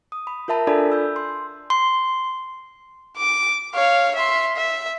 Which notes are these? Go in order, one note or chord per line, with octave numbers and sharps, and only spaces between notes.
D#6
B5
F4 A#4 E5 A5 B5
D4 F4 A4 D5 G#5 B5
E6 G6
C6
C6
D6
C#5 F5
E5 C6
E5